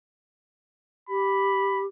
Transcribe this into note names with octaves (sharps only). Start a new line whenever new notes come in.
G4 B5